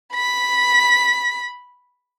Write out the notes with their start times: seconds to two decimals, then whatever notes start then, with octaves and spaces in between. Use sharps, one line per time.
0.13 B5 B6